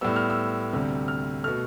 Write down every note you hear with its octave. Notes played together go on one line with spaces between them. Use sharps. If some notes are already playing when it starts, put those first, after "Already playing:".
A2 G3 B3 E6
F6
E6
D2 C3 G3
F6
B2 A3 F6